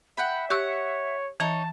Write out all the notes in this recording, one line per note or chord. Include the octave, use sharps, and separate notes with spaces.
E5 F#5 G5 B5
G4 C#5 F#5 C#6 E6
E3 D#4 C#5 A5